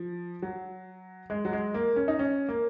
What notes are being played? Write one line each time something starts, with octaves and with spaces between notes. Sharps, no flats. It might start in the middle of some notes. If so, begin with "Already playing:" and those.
Already playing: F3
F#3
G#3
F#3
G#3
A#3
C#4
D#4
C#4
A#3